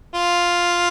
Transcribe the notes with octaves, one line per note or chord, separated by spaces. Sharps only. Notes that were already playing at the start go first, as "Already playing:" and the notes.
F4